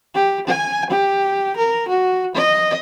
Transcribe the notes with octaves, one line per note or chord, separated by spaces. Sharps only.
G4
G#5
G4
A#4
F#4
D#5